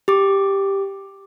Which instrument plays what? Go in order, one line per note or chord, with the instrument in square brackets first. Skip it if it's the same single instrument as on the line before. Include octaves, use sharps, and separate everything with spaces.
[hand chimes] G4 D6